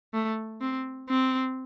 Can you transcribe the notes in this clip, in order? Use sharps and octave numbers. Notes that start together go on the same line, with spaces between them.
A3
C4
C4